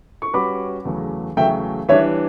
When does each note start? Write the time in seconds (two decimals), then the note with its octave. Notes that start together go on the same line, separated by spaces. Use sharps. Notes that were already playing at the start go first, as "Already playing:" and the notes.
0.22 C#6
0.33 G3 C#4 F#4 B4 B5 D6
0.85 E2 C#3 F#3 A3
1.37 E2 C#3 F#3 A3 E5 G5
1.89 E3 G3 D4 C#5 E5